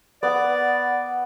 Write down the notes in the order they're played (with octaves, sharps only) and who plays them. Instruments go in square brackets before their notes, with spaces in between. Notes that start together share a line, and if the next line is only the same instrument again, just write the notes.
[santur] B3 F#5 [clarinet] D5